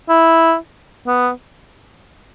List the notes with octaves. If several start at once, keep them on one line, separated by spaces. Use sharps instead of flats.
E4
B3